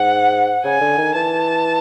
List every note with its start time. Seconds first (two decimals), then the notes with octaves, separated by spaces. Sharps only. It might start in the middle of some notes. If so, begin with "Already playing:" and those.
Already playing: G#2 F#5
0.64 C#3 G#5
0.81 D3
0.98 D#3
1.15 E3 A5